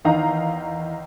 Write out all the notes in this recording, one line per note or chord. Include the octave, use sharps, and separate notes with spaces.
E2 D#3 D#4 F5 A#5